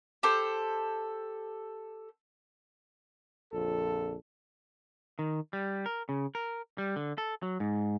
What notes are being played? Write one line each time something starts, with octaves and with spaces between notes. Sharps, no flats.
G4 A4 C5
A#1 F2 D3 A4
D#3
G3
A#4
C#3
A#4
G3
D3
A4
F#3
G#2